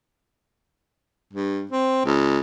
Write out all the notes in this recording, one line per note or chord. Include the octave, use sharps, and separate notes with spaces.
G2
C4
C#2